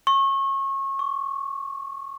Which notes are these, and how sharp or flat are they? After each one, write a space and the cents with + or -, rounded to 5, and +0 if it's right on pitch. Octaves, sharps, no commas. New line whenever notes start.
C#6 -30
C#6 +35